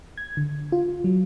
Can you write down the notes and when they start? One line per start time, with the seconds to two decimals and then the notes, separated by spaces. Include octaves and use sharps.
0.17 G#6
0.37 D3
0.72 F4
1.04 F#3